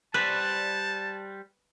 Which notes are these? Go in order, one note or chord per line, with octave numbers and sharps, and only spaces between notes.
G3 B4 C5 D5 A5 F#6